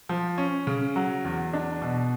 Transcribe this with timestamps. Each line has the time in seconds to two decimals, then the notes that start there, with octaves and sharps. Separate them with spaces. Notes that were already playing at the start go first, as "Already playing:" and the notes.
0.09 F3
0.38 C#4
0.67 C#3
0.96 F#3
1.25 E2
1.53 D4
1.82 B2